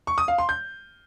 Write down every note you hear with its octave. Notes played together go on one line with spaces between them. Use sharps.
C#6
D#6
F5
C6
G6